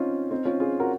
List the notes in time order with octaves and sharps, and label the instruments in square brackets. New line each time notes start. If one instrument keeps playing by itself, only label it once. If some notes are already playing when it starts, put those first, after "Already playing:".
Already playing: [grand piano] C4 C#4 D#4 F4
C4 D#4
C#4 F4
F4 G#4
F#4 A#4